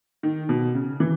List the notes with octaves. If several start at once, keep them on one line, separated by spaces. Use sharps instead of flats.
D#3
B2
C#3
E3